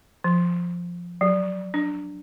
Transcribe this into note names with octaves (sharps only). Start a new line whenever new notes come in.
F3
F#3
D4